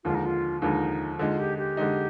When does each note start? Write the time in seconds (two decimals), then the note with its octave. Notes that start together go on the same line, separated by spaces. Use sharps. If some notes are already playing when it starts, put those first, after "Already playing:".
0.04 D#2 D3 F3 G#3 F4
0.15 D#4
0.26 F4
0.62 D#2 D3 F3 G#3 D#4
1.19 D3 G#3 D#4 F4
1.39 G4
1.58 G4
1.77 D3 G#3 D#4